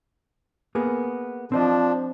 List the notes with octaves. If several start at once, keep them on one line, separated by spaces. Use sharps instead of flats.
A#3 B3 G#4
F3 C4 D4 C5 D#5